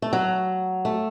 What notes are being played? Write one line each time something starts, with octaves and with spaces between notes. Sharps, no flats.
A3
F#3
A3